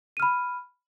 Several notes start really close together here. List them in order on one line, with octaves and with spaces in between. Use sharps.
D#7 F6 B5